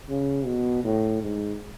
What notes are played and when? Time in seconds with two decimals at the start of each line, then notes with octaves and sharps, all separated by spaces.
0.09 C#3
0.45 B2
0.84 A2
1.22 G#2